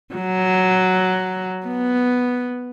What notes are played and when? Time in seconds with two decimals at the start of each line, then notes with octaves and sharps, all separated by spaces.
0.15 F#3
1.67 B3